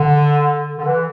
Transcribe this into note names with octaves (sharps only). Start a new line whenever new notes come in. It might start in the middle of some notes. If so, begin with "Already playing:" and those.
Already playing: D3
D3
E3